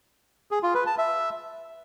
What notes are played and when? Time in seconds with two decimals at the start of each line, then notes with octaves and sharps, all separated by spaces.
0.51 G#4
0.63 F4
0.75 B4
0.86 A5
0.98 E5